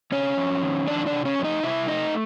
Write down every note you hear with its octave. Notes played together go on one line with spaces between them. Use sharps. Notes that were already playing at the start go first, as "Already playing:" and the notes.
C3 C#4 C#5
F2
D#3
F2 D4 D5
D4 D5
C3
C#4 C#5
F2
D#4 D#5
C3 E4 E5
A3 D#4 D#5